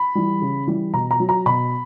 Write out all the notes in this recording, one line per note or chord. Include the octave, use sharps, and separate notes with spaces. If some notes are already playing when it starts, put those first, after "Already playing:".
Already playing: B5
E3 G3
C#3
E3 G3
B2 A#5
A#5
F#3
A#5
B2 B5